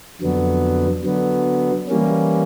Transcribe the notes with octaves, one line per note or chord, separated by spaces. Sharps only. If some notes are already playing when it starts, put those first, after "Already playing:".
F2 D3 F#3 B3
D3 F#3 B3
E3 G3 A#3 C#4